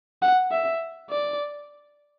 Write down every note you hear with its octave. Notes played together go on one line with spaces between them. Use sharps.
F#5
E5
D5